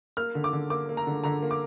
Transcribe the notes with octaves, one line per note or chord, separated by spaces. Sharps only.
A#3 F6
D3
D6
D3
A#3 D6
A#3
A#5
D3
D3 A#5
A#3
D6